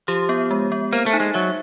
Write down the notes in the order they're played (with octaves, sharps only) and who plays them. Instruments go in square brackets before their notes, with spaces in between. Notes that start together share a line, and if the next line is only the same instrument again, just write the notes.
[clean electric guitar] F3 [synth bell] G4
[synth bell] B3
G#3
B3
[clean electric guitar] A#3 [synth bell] C5
[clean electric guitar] A3
[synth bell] D#4
[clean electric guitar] G#3
[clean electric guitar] F#3 [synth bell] E5